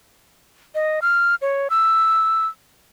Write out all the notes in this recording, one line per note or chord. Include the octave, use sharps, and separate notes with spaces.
D#5
F6
C#5
E6